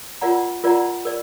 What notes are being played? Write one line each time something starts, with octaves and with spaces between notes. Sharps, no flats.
F4 A#4 D5 F#5 A#5
F4 A#4 D5 F#5 A#5
A#4 D5